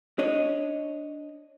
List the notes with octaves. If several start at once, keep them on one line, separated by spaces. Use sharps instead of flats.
D4 C#5 D#5